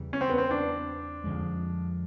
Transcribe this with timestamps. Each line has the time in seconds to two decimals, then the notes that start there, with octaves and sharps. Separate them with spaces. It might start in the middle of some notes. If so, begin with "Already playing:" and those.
Already playing: E2 C#3 E3 G3
0.13 C#4
0.21 C4
0.30 B3
0.38 C4
0.51 D4
1.24 F2 D3 F3 G#3